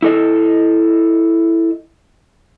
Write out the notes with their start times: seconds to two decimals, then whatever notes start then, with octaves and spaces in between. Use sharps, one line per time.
0.02 E4 A4 D#5